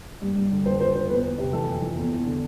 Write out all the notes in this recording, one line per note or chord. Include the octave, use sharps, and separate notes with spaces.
G2
G2
D3
F2 C5
F2 C5
D3 C5
E2 B4
E2
C3
E3 A4
F2
E3
E2
E2
D3